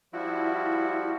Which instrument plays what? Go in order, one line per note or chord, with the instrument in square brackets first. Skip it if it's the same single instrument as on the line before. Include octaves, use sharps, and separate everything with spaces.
[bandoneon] F3 G3 F#4 [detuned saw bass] E4